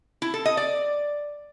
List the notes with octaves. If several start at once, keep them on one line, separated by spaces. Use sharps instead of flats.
E4
A4
D#5
D5